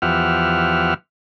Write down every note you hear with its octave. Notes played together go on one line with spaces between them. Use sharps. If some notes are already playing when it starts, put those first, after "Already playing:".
E2 F3 G4 E5 F#5 F6